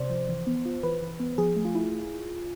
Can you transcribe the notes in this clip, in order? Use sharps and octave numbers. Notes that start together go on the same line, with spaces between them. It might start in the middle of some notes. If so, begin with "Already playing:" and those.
Already playing: C3 C5 D5
F3
E3
B3
F4
E3 B4
E3
B3
F3 G#4
A3
F4
E4